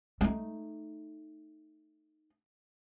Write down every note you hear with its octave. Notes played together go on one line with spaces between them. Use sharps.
A3 D#4